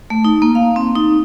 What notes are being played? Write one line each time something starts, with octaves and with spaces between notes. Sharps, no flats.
A3
D#4
A#3
F5
C4
D#4